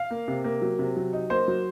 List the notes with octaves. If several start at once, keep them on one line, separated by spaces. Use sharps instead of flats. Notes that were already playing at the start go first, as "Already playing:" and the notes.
Already playing: F5
A#3
C3
A#3
F#3
C3
F#3
D#4
A#3 C5
F#3